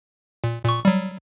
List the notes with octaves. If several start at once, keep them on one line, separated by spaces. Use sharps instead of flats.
A#2
A#2 C#6
F#3 G3